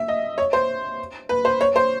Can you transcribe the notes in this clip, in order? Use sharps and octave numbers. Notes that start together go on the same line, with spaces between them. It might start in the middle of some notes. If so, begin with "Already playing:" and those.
Already playing: E5
D#5
C#5
C5
B4
C5
C#5
C5